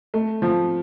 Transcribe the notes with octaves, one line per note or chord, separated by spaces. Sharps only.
A3
F3